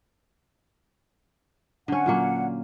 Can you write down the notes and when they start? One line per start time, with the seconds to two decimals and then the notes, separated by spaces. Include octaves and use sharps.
1.88 D3 C#4 F#5
2.06 A#2 F#3 A#3